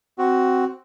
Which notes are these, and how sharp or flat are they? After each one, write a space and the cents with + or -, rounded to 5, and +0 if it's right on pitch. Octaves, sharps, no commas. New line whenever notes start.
C4 +0 F#4 +10